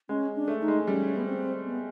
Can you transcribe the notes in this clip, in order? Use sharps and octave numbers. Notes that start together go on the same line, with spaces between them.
G#3 C#4
D4
A3
D#4
G#3
G3 C#4
B3
C4
B3